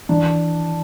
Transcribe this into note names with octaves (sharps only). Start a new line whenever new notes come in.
E3 D4